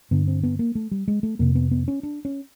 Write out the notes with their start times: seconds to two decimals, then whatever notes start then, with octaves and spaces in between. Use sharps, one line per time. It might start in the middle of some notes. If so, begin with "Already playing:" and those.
0.11 G2 D3 B3
0.28 C4
0.43 B3
0.59 A#3
0.75 A3
0.91 G3
1.08 G#3
1.23 A3
1.39 F2 C3 A#3
1.55 B3
1.71 B3
1.88 C#4
2.03 D4
2.25 C#4